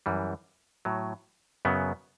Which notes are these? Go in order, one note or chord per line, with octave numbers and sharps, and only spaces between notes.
F#2 E3 G3
A2 F#3
F#2 C#3 F#3 B3